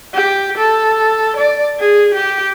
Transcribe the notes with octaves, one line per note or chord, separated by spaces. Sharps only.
G4
A4
D5
G#4
G4